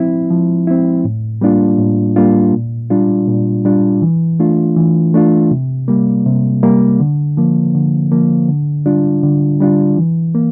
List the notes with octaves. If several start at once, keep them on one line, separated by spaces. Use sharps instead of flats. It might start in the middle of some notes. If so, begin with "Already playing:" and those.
Already playing: F3 C4 E4
F3
C4 E4
A2
G3 A#3 D4 F4
A2
G3 A#3 D4 F4
A#2
G3 D4 F4
A#2
G3 D4 F4
E3
A3 D4 F4
E3
A3 D4 F4
C3
G3 A#3
C3
G3 A#3
D3
F3 A#3
D3
F3 A#3
D3
G3 D4 F4
D3
G3 D4 F4
E3
A#3